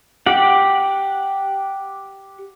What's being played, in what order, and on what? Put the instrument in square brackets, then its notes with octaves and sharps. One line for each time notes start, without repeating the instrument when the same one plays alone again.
[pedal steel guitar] G4 F#5